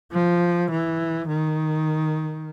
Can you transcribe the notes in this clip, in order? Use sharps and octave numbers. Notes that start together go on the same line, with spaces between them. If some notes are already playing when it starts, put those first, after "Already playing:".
F3
E3
D#3